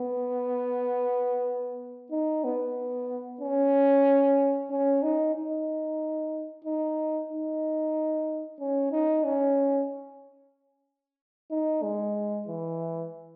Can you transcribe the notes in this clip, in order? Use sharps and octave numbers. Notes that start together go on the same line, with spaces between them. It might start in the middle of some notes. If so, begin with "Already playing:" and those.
Already playing: B3
D#4
B3
C#4
C#4
D#4
D#4
D#4
D#4
C#4
D#4
C#4
D#4
G#3
E3